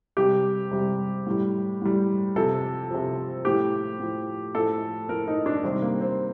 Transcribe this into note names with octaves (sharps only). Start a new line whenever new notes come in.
C3 G3 G4
C3 G3
A2 G3
A2 G3
C3 F3 A4
C3 F3
A2 F3 G4
A2 F3
A2 F3 A4
A2 F3 A#4
D#4
D4
C3 D#3 G3 C4
A#3
C4